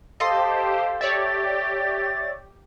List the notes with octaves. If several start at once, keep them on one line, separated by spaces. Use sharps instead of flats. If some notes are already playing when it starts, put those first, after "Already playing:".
G4 A4 C5 D#5 F5 C6
G4 C#5 D5 E5 A6